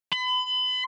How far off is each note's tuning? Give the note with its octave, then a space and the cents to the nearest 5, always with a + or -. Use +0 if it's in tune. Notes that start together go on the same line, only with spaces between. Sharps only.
B5 +35